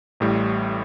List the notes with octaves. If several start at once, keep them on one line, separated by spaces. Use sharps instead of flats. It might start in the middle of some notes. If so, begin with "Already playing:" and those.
A1 A2 G3